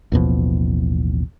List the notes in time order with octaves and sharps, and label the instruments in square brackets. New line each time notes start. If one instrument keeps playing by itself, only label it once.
[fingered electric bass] A1 D#2 B2 F3